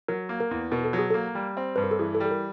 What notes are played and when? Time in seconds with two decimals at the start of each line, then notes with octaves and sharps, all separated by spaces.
0.08 F#3 A#4
0.29 A#3
0.40 A#4
0.51 E2
0.72 B2 A#4
0.84 A4
0.93 F#3
0.99 G#4
1.10 A#3 A4
1.35 G3
1.57 C4
1.76 G2 B4
1.84 A#4
1.91 A4
1.99 E3 G#4
2.15 A4
2.20 G3
2.25 A4
2.31 A#4